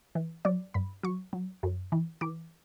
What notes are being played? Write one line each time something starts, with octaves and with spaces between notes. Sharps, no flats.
E3
F#3 D5
G2 B5
F#3 C#6
F#3
F#2
E3
E3 D6